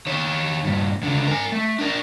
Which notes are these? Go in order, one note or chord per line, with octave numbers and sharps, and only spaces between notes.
D#3 C#5
G2 A#2
C#2 D3
A#4 G#5
A3
D4 A#4